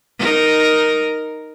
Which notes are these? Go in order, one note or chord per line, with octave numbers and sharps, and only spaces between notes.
D#4 A#4